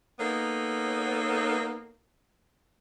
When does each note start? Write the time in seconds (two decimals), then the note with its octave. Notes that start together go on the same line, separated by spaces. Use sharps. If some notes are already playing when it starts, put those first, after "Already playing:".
0.20 A#3 B3 D#4 A4 C#5